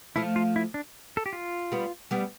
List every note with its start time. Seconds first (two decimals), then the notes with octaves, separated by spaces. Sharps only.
0.16 F3 A3 E4
0.36 F4
0.56 E4
0.74 D4
1.17 A4
1.26 G4
1.33 F4
1.72 G3 B3
2.11 G3 B3